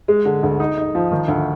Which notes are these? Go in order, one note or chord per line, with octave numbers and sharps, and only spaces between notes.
G#3
D3
D2
D#4
D#4
F3
D#3
D2